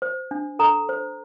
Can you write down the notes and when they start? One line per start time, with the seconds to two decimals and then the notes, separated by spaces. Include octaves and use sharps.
0.02 C5
0.31 D4
0.59 A4 A#5
0.89 C5